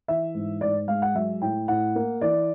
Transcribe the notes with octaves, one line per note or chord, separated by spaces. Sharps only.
E3 E5
G#2
G#2 D5
G#3 F5
F#5
F#3 E5
A2 G5
A2 F#5
A#3
E3 D5